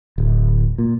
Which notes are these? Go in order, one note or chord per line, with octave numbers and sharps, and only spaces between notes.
D1
A#2